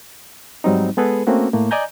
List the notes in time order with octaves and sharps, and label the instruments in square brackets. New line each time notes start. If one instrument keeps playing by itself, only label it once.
[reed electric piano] G#2 F#3 G3 C4 D#4
G#3 B3 G#4 A4 B4
A3 A#3 C4 C#4 F#4
A2 A3 A#3
D5 D#5 G#5 A#5 G6